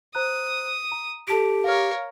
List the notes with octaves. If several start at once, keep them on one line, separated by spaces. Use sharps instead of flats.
C5 A#5 D#6 F#6
A#5
G4 A4 A5 D7
A#4 C#5 F5 F6